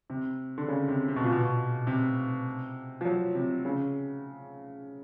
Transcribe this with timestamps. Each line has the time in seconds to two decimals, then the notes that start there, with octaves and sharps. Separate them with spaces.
0.10 C3
0.58 D3
0.68 C#3
0.88 C3
1.08 C3
1.16 B2
1.24 A#2
1.32 B2
1.87 C3
3.01 F3
3.05 F#3
3.35 C3
3.65 C#3